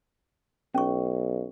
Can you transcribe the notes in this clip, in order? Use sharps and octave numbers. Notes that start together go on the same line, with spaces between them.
B1 C#4 C#6